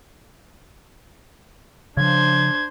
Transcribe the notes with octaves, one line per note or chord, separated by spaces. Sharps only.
C#3 F3 D4 C5 G#6